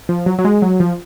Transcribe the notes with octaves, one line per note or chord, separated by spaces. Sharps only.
F3
F#3
F#3
G#3
F#3
F3